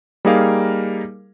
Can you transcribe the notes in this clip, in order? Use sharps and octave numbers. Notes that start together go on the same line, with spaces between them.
G3 A#3 D#4 G#4 A#4 F5